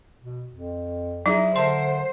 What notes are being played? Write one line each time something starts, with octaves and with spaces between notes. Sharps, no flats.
B2
F2
F#3 D#4 E4 G#4
D3 A#4 C5 E5 A5 C6